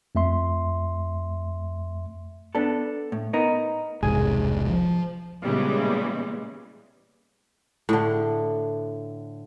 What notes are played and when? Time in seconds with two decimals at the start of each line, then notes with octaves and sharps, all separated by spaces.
0.15 F2 A3 E5 C6
2.55 B3 D4 A4
3.12 A2
3.33 B3 D#4 A#4
4.03 E1 C2 G#2 G#4
4.69 F3
5.43 A#2 C#3 E3 G3 G#3 B3
7.89 A2 D3